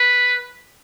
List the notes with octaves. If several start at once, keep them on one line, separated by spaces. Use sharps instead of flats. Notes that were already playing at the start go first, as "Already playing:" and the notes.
Already playing: B4